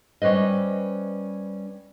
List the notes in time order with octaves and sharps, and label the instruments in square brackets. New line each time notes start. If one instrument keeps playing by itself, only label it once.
[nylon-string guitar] G3 C#4 B4 C5 D#5